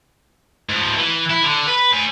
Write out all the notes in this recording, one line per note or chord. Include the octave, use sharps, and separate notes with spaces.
G#2 F3
E3
E4
D3
B4
C5 G#5